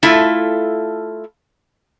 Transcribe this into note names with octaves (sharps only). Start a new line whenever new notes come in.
A3 E4 F4 A4